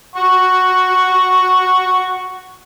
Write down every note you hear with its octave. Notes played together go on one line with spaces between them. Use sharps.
F#5 C#6